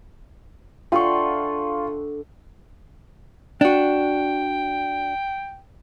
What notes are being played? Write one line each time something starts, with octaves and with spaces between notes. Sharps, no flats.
D3 F4 E5 F#5 G5 C6 C#6
D4 F#4 G5